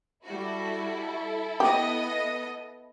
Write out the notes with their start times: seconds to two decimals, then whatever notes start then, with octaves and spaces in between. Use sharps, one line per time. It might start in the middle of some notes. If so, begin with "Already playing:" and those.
0.24 G3 E4 F#4 A4
1.60 B3 G4 D#5